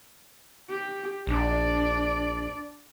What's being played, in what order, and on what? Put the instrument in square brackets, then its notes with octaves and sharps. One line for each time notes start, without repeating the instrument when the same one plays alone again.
[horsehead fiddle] G4
[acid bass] A#1 [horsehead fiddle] D4 D5